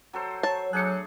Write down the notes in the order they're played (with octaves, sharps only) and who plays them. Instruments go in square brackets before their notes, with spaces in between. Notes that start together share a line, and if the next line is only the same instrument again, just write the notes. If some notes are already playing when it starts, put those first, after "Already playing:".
[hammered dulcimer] F#3 A4 C5
[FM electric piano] C#5 [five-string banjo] A5
[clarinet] F#3 [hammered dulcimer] A3 D4 G#4 [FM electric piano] F#6 G6 C#7